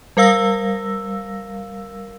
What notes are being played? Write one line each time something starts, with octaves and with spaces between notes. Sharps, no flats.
G3 A#4 F5 E6 A#6